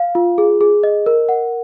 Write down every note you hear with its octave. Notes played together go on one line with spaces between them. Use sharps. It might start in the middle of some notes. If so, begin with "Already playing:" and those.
Already playing: F5
F4
G#4
G#4
D#5
A#4
F#5